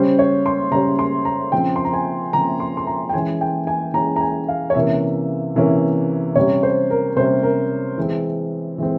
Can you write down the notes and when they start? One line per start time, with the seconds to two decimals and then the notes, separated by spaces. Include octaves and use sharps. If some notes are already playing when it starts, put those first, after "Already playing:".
Already playing: C#3 G3 C#4 C5
0.19 C#5
0.46 C6
0.71 C#3 G3 C#4 A#5
0.99 C6
1.25 A#5
1.52 C#3 F3 C4 G5
1.76 C6
1.85 A#5
1.93 G#5
2.33 C#3 F3 C4 A#5
2.60 C6
2.77 C6
2.87 A#5
3.09 G5
3.13 E3 G#3 C#4 G#5
3.41 G5
3.67 G#5
3.94 E3 G#3 C#4 A#5
4.16 A#5
4.21 G#5
4.48 F5
4.70 C#5
4.75 C3 E3 A#3 C#4 E5
5.55 C3 E3 A#3 C#4
6.36 C3 G3 C#4 C#5
6.63 C5
6.90 A#4
7.16 C3 G3 C#4 C5
7.43 A#4
7.98 E3 G#3 C4
8.78 E3 G#3 C4